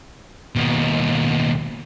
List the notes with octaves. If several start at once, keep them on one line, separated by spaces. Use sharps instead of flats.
D#2 B2